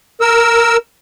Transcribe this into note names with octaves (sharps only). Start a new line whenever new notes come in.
A#4 E6